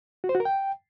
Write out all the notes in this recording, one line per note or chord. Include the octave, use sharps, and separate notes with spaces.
F#4
C5
F#4
A#4
G5